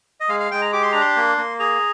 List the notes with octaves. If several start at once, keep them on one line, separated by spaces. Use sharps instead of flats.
D#5
G#3 F5
F5
G#3 G5
A#5
G4 D6
C6
D4 A#5
C6
A#3
A#3
G#4 A#5